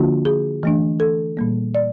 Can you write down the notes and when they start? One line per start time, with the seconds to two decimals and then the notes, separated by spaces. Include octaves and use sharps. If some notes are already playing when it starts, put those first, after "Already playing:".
Already playing: D3 F3 A#3 D4 F4 F#4
0.25 G#4
0.63 E3 A3 D4
1.00 A4
1.37 A#2 G3 A#3
1.75 D5